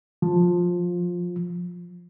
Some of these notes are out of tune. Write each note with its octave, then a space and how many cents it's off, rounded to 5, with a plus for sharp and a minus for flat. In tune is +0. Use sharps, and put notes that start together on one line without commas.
F3 +15